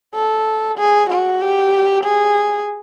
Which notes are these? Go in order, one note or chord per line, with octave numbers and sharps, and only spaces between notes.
A4
G#4
F#4
G4
G#4